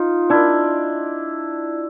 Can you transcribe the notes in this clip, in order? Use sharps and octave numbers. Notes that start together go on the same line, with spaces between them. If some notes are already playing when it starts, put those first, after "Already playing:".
Already playing: D#4 F4
D4 E4